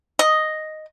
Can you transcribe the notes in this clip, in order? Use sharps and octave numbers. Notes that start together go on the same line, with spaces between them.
D#5